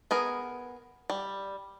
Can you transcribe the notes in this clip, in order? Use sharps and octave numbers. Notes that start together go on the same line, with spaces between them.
B3 G#4 A#4
G3